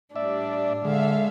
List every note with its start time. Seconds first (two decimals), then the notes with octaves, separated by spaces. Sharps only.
0.16 A2 G3 D4 D5 E5
0.85 D3 G#3 A4 E5 F5